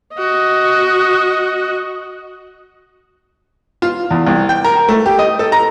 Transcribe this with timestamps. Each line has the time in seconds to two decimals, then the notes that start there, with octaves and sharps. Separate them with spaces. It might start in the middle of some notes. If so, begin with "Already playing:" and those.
0.15 F#4 D#5
3.82 F4
4.10 E2
4.26 C2
4.49 G5
4.64 A#4
4.88 A3
5.06 G4
5.19 D#5
5.39 A4
5.52 A#5